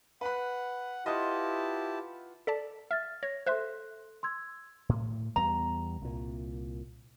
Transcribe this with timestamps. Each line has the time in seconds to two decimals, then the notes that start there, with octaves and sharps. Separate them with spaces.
0.21 B4 F#5 B5
1.06 E4 F4 G4 B4 D#5 F#5 A5
2.47 A4 D5 A5 B6
2.91 E5 F6 A6
3.23 C#5 A#6
3.47 A4 C5 E5 C6 F#6
4.23 C6 E6 G#6
4.89 A2
5.36 E2 G3 B3 A#5
6.02 C2 A#2